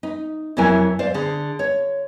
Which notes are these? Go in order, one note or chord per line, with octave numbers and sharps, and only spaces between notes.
D#4
F2 C3 F#3 E4 A#4 G#5
C5 D5 F5
D3 G#4
C#5